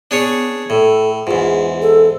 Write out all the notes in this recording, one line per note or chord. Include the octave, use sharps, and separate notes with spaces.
B3 D4 G#4 C#5
A2 A4
E2 G#2 F4
A4